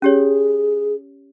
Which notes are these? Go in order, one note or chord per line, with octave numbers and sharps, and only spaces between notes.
C#4 G4 G#4 C#5